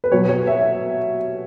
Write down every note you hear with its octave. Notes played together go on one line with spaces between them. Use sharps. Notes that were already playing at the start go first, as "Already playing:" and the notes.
B4
B2 F#3 C#5
C#5
E5